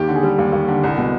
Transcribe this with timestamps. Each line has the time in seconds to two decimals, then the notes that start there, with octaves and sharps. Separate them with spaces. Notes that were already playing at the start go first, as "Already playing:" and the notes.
Already playing: D#2 D#3 G4
0.08 D3
0.16 G#4
0.23 G3
0.39 D#2
0.53 D#2
0.68 D3
0.84 C2
0.98 B2